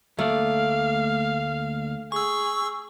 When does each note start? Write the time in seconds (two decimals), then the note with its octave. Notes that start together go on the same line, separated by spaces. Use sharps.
0.19 D2 A3 A#3 D5 F5
2.12 G#4 C#6 E6